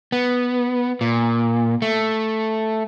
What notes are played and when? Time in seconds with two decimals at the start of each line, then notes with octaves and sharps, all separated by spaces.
0.12 B3
1.01 A#2
1.82 A3